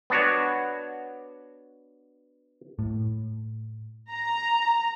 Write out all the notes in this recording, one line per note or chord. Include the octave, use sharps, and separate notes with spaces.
B3 D4 F#4 C#5
A2
A#5